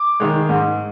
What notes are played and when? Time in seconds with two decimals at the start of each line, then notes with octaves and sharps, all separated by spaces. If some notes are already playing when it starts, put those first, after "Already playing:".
Already playing: D6
0.20 D#3 G#3
0.49 G#2